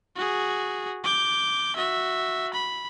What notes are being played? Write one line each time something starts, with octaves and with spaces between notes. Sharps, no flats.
F#4 G#4
D6 G6
F#4 E5
B5